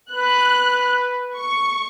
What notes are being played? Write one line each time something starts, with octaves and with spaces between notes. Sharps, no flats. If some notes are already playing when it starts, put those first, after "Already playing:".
B4 F#6
C#6